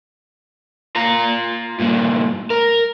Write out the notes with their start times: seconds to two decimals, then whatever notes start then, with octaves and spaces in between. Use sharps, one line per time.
0.96 F4 A#5
1.79 G2 A#2
2.50 A#4